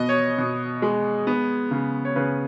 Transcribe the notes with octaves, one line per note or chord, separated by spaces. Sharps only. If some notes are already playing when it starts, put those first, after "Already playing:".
Already playing: B2 B3 D#5
C#5
B2
G#3
B3
C#3
C#5
C#3 B4